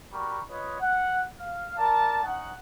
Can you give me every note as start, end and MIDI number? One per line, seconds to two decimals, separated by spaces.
0.11 0.41 55
0.11 0.41 66
0.11 0.41 70
0.11 0.41 83
0.11 0.41 85
0.49 0.77 65
0.49 0.77 71
0.49 0.77 73
0.49 0.77 75
0.79 1.21 78
1.39 1.74 77
1.77 2.22 70
1.77 2.22 74
1.77 2.22 81
2.23 2.52 61
2.23 2.52 63
2.23 2.52 78